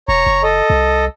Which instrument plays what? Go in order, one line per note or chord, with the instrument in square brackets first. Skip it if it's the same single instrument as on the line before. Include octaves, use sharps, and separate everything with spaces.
[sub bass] E1 [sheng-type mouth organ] C#5 A#5 C#6
[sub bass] F#1
[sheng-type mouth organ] A4 D#5
[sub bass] C2